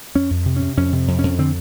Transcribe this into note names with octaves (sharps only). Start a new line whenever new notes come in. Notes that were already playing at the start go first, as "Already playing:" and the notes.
F2 C#4
F2
C3
C3 C#4
F2 C#4
C3
F2
F2 C#4
D3 C4